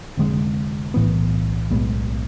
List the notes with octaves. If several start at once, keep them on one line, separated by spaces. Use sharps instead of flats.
F1 F2 D3 G#3
B1 A2 E3 B3
B1 A2 G#3 B3